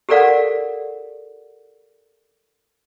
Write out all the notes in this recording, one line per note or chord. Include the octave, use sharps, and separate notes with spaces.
G4 A4 A#4 D5 F5 F#5